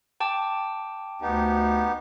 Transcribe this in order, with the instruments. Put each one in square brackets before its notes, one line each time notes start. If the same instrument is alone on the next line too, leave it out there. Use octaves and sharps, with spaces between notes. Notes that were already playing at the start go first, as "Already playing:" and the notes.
[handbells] G5 A5 D6
[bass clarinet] D2 [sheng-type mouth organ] B3 D#4 G4